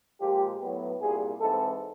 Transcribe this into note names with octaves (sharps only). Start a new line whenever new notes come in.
A#2 F3 G#3 G4
A2 F#3 B3
C2 A#2 G3 G#4
G#2 E3 G#3 C4 A4